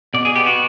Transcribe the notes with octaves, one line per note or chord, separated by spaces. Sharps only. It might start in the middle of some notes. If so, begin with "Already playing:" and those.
B2 D5
G#4
B3 G4
F#4